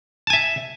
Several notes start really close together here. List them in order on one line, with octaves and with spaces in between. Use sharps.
A5 G#5 E5